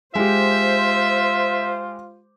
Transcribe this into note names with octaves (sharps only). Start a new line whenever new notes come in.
G#3 F4 G4 C5 E5